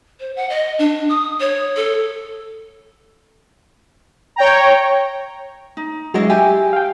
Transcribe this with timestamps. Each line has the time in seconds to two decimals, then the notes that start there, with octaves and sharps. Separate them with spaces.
0.20 C5
0.36 F#5
0.49 D#5
0.79 D4
1.09 D#6
1.40 C#5
1.76 A4
4.36 C#5 G5 A#5
5.77 D#4
6.14 F#3 G#3 D4 E4 F#4 D#5
6.30 G4 E5 G#5
6.73 F5 G5